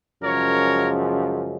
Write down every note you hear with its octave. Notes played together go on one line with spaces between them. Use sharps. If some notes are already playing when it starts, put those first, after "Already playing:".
F#2 C#3 F3 G#3 A#4 C#5